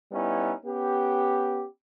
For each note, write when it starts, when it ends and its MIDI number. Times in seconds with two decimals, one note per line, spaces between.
0.12 0.52 55
0.12 0.52 59
0.12 0.52 61
0.12 0.52 63
0.12 0.52 64
0.65 1.65 59
0.65 1.65 61
0.65 1.65 67